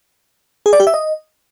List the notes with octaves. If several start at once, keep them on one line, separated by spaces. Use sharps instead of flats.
G#4
D5
G4
E5
D#5